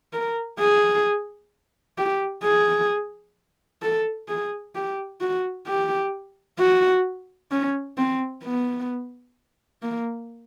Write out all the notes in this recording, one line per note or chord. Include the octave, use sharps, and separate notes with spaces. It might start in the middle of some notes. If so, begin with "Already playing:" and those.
A#4
G#4
G4
G#4
A4
G#4
G4
F#4
G4
F#4
C#4
C4
B3
A#3